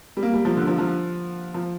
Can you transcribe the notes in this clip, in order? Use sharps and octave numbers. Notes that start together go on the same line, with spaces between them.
G3
A#3
G3
F3
D3
F3
F3
F3